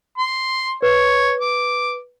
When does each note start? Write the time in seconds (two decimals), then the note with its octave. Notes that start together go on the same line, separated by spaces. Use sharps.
0.18 C6
0.82 B4 C#5
1.41 D6